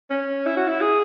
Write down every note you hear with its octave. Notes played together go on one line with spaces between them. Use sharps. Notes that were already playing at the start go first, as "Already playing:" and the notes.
C#4
E4
F#4
E4
G#4